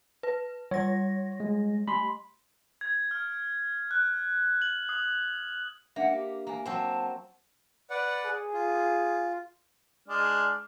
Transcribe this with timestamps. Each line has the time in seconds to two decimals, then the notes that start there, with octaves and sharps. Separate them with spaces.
0.23 B4
0.71 G3 C#5 A#6
1.40 G#3
1.88 A3 B5 C6
2.81 G#6
3.11 F6
3.91 F#6
4.62 F#7
4.89 D#6
5.96 A#3 D4 E5 F#5
6.11 G4
6.47 A#3 G#5 A#5
6.66 F#3 C4 C5 A5
7.90 B4 D5 F#5
8.25 G#4
8.54 F4
10.08 G#3 D4 F6